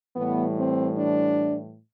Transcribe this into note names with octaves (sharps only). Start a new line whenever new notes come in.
A2 E3 G3 B3
C4
D4